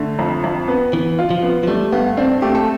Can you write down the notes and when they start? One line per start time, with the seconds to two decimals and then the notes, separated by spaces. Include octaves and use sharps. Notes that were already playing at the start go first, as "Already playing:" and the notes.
Already playing: D3 A3
0.19 F2
0.44 F2
0.68 B3
0.93 E3 B3
1.19 F4
1.31 F3
1.43 B3
1.63 F3
1.67 G3 A3
1.92 G2 B3
2.17 C4 D4
2.42 A3 G4
2.55 A4